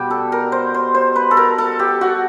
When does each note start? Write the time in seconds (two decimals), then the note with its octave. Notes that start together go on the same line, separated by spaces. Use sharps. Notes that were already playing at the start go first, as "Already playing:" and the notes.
Already playing: B2 G3 G4
0.10 A4
0.32 A#4
0.52 C5
0.74 C5
0.94 C5
1.16 B4
1.31 A4
1.37 A#4
1.58 A4
1.79 G4
2.01 F#4